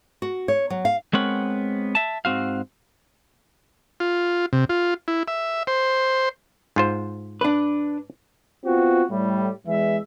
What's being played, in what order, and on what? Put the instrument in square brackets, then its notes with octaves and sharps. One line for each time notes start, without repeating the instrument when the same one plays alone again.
[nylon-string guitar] F#4
C#5
F#3
F5
[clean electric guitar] G#3 B3 C4 A#4 C#5 F#5
E5 A5
G#2 C4 F#4 F5
[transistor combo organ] F4
C3
F4
E4
E5
C5
[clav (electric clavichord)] G#2 F4 C5
[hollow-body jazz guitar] D4 B4
[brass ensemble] B3 C4 F4 F#4
A2 G3
E2 E3 G#3 E5